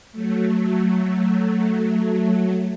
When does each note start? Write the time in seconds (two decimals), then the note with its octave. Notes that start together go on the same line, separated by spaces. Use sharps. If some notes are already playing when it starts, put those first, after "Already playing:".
0.12 F#3 A3